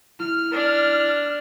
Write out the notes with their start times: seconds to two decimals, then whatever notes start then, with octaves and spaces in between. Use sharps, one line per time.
0.20 E4 F6
0.52 D4